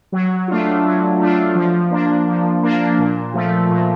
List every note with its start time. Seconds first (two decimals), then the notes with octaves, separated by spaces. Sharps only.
0.12 F#3
0.48 A3 D4 F4
0.85 F#3
1.19 A3 D4 F4
1.55 F3
1.91 A#3 D4
2.27 F3
2.63 A#3 D4
2.98 A#2
3.34 F3 A3
3.70 A#2